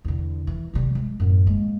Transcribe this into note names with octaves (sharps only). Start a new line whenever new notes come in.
E2 D3
E3
C3 G3
F#3 G#3
F#2 A2
G#3 A#3